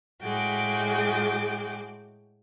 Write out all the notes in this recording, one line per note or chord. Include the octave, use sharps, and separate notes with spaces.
A2 G#3 F#4 G#4 G5 D6